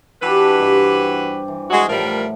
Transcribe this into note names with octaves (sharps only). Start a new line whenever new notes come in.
E3 D4 F#4 G4 B4 A5
G2 D#5 F5
C5 D5
E3
G#3 F#4
A2 F3 G3 A#4 F5 F#5